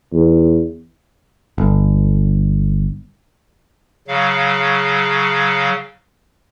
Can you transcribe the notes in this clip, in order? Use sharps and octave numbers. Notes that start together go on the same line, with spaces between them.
E2
G1
C#3 F#3 F5